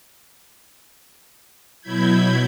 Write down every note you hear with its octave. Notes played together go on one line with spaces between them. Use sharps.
B2 F#3 E4 B5 G6 G#6